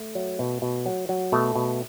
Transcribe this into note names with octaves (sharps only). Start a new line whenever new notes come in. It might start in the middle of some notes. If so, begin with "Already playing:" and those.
Already playing: A3
F#3
B2
B2
F#3
F#3
B2 A3
B2